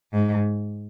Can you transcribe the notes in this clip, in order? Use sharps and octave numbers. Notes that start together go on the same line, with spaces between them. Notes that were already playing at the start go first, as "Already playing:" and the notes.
G#2